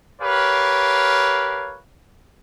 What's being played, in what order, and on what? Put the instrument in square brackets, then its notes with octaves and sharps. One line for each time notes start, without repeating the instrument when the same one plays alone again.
[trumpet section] G4 A#4 B4 C#5 F5